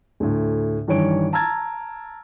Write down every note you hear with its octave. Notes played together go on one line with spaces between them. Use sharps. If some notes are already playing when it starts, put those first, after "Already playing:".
D2 A2
G2 D#3 E3 C#5 D7
A5 A#5 E6 F6 G#6 A6